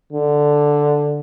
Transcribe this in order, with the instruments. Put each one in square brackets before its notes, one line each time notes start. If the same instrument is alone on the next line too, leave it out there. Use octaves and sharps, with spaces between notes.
[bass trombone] D3